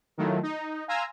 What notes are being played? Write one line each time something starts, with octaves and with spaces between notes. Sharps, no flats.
D#3 F#3 A3 E4 F4
D#4
F5 G#5 A#5 C6 E6